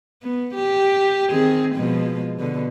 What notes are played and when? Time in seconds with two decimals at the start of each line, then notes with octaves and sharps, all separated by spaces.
0.23 B3
0.55 G4
1.29 D#3 C4 G#4
1.75 B2 F3 G#3
2.39 B2 D3